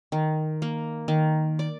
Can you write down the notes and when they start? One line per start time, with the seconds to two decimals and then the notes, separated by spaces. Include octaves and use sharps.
0.12 D#3
0.62 A#3
1.08 D#3
1.59 D5